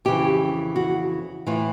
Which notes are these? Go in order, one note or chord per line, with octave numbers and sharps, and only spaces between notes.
F2 C#3 E3 G4
F#4
A2 E3 F4